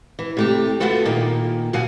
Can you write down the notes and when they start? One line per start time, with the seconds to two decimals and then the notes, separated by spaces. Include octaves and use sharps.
0.19 E3
0.37 C3 A3 G4
0.80 A3 B3 F4 F#4 A4
1.05 A#2 D#3 A#3
1.73 A#2 C#3 F#3 F#4 G#5